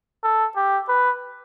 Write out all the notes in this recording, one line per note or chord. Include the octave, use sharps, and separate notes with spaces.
A4
G4
B4